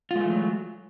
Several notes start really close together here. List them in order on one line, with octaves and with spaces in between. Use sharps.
F4 G#3 A3 E3 F#3